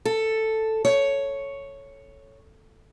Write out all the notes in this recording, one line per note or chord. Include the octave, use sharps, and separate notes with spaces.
A4
C#5